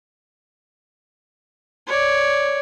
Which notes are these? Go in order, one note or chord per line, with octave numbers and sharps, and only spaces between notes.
C#5 D5